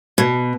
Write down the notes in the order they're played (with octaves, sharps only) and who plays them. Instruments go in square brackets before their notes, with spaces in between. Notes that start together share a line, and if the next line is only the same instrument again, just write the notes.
[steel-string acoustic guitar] B2